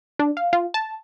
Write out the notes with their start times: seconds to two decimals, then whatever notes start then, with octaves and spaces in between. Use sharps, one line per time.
0.19 D4
0.37 F5
0.53 F4
0.74 A5